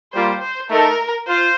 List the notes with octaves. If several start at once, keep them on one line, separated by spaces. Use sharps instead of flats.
G3 A#3 F4 C5
C5
A3 D#4 A4 A#4
F4 C5